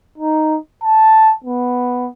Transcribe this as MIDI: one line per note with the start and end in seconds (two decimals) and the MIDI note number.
0.18 0.57 63
0.84 1.33 81
1.44 2.09 59